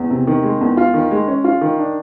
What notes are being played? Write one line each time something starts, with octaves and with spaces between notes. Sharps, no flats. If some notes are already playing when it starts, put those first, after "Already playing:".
Already playing: E2
C3
D#3
G#3
E2
F4
D#3
G#3
C#4
F4
D#3
D4